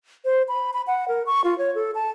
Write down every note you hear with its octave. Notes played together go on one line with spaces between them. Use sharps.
C5
B5
B5
F#5
A#4
C#6
F4
C#5
A4
A5